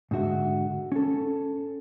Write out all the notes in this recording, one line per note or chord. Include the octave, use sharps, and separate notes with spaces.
G#2 D3 F#4 E5
C#4 A4